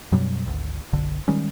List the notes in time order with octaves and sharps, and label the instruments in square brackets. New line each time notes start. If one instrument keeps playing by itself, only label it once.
[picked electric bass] F#2 B2 F#3 G3
G#1 D2
F#1 B1 D3
D#3 G3 G#3 C#4